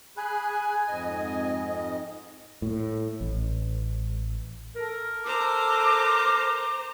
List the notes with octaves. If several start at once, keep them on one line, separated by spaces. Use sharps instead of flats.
G#4 G#5 B5 F#6
F2 G#2 D#5
A2
A1
A4 A#4
C5 A#5 D6